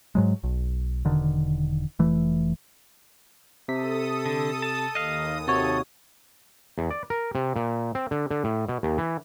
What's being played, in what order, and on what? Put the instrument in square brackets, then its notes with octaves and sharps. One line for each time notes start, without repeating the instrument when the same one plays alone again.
[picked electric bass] G#2 F#3 G#3
B1
E1 D3 D#3
F1 E3 A3
[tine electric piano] C3 B6 [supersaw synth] A4 D#6
[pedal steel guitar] D3
A5
[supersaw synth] D#2 D#6 [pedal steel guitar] D#5 F5
[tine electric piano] C3 F#4 C#5 [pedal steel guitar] A4
[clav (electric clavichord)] E2
D5
A#4
C3
A#2
C4
D3
D3
A2
B2
D#2
E3